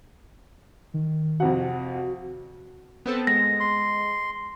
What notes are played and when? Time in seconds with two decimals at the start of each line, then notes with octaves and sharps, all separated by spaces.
0.94 D#3
1.40 F2 C3 F#4 F#5
3.06 B3 C4 A4
3.27 G#3 A#6
3.60 C6